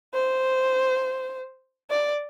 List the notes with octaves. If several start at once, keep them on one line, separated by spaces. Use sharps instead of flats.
C5
D5